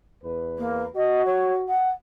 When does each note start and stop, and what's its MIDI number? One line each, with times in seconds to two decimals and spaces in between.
0.23 0.88 40
0.23 0.88 71
0.58 0.82 58
0.96 1.72 66
0.96 1.24 75
1.25 1.54 73
1.68 1.89 78